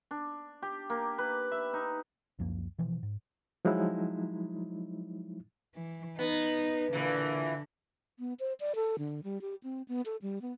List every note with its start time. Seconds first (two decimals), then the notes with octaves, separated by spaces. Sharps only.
0.11 D4
0.62 G4
0.90 A#3
1.18 B4
1.51 E5
1.73 D#4
2.39 C#2 F#2 F3 A#3
2.78 B2 E3 F3
3.03 G#2
3.65 F3 F#3 G#3 D#4 E4
5.75 E3
6.19 B3 D#4
6.93 A#2 D3 E3
8.19 B3
8.40 C5
8.60 D5
8.75 A4
8.99 D3
9.24 G3
9.41 G4
9.63 C4
9.88 B3
10.06 A4
10.22 G3
10.42 B3